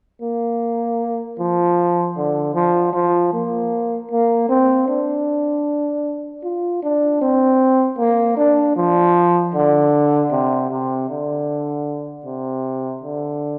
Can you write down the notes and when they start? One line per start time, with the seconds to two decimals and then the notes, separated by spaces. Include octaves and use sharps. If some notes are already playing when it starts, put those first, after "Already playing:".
0.22 A#3
1.39 F3
2.17 D3
2.54 F3
2.93 F3
3.33 A#3
4.11 A#3
4.49 C4
4.88 D4
6.43 F4
6.83 D4
7.21 C4
7.98 A#3
8.37 D4
8.76 F3
9.54 D3
10.31 C3
10.71 C3
11.09 D3
12.25 C3
13.03 D3